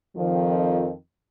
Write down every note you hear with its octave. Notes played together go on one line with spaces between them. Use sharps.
F2 D#3 F3